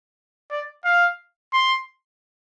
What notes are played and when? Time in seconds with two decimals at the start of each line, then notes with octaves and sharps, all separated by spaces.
0.51 D5
0.85 F5
1.53 C6